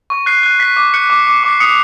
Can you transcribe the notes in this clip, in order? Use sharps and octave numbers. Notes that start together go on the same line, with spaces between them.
C#6
F#6 C7
F#6
F#6 B6
D6
F#6 C#7
D6
D6
D6
C7
D#6 C#7